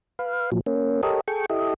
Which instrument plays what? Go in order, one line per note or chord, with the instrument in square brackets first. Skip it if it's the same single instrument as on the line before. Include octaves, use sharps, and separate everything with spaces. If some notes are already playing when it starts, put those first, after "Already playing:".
[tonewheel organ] B4 F5
A#2 F3 F#3
A#3 C#4
G4 A4 A#4 C#5 D#5
G#4 A4 G5 C#6
E4 G4 A4 D#5